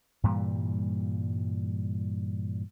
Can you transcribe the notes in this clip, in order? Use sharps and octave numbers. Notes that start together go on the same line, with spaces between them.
G2 A#2 E3 G3